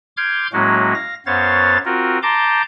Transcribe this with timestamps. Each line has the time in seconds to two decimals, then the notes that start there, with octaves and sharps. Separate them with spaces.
0.17 C6 D6 F6 G6 G#6
0.53 A2 F#3 G#3 A#3 C#4 F#4
0.94 F5 A#6
1.26 F#2 B3 C5 C#5 F5 A6
1.85 C4 F4 F#4 A#4
2.23 A5 A#5 C6 D6 G6